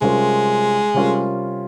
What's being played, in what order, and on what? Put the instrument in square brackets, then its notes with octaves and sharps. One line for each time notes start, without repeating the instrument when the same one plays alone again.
[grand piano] C3 G3 C#4 F4 A#4 [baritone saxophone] G#3
[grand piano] C3 G3 C#4 F4 A#4